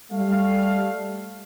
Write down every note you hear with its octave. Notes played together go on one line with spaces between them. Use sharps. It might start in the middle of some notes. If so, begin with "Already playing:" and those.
G3 A3 F5